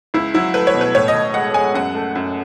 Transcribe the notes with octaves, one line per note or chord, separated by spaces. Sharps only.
C#2 E4
F#3 E4
A3 B4
C#5
B2
B4
A2 C#5
D#5
A2
G#3 F#5
G#3 G#5
F#2 F#5
A3
F#2